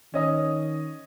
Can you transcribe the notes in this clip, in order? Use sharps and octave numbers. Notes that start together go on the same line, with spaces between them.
D#3 C#4 D#5 D#6